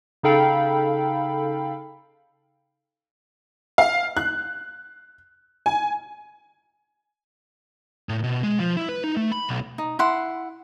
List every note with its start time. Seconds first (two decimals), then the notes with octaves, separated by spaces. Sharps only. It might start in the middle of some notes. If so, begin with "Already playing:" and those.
0.23 C#3 D#4 A4 F5 G5 B5
3.78 F5
4.17 F#6
5.66 G#5
8.09 A2
8.24 B2
8.43 G#3
8.60 F3
8.77 E4
8.89 B4
9.04 D#4
9.17 A3
9.32 B5
9.49 B1
9.78 D#4
9.99 E4 F#5 C6